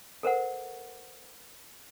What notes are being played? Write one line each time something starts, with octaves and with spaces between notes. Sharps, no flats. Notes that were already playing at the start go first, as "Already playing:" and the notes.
A4 A#4 C5 F#5